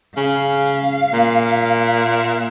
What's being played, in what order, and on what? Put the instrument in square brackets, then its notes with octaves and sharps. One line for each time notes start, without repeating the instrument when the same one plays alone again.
[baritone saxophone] C#3 [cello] F5
[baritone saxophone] A#2